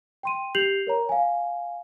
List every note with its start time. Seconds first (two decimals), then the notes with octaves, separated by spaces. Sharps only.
0.23 G5 C6 D#7
0.55 G4 G6 C7 F7 F#7
0.87 A#4 C#5 A#5
1.09 F5 G#5